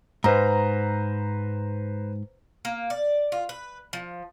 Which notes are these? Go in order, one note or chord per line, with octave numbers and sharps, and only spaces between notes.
G#2 B4 C5 A#5
A#3
D5
F4
B4
F3